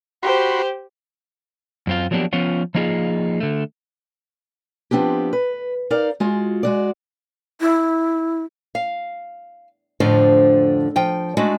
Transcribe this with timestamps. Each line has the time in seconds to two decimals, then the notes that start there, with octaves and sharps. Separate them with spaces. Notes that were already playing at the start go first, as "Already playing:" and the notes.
0.23 F#4 G4 C5 B5 C6
1.87 F#2 C4 F4
2.11 F3 F#3 A#3 B3 D4 G4
2.33 F3 B3 C#4 F4
2.75 F3 A#3 D#4 F4 G#4
3.40 D3 A3
4.91 F3 B3 C4 D4 G4
5.33 B4
5.90 D#4 A#4 D5 F5
6.20 G#3 F4 F#4
6.63 G#3 F#4 D5
7.61 E4
8.75 F5
10.00 F2 A2 D3 F3 D4 C5
10.96 F3 G5
11.37 G#3 A3 D4 F#4